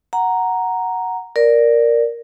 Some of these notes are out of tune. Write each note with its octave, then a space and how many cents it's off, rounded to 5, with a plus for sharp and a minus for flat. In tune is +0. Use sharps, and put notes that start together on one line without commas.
F#5 +0 A#5 +0
A#4 +0 D5 +0